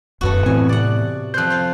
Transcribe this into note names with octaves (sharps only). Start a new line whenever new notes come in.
D#1 F#2 A3 B3 F#4
A2 E3 B3 C4 G#5
C3 D5 F#5
F2 C5 F#6 G6
F4 F5